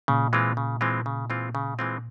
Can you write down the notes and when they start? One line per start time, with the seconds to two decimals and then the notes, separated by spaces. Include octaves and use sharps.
0.08 A#2 C#3
0.33 E3 G#3 C4 F4
0.57 C#3
0.81 E3 G#3 C4 F4
1.06 C#3
1.30 E3 G#3 C4 F4
1.55 C#3
1.79 E3 G#3 C4 F4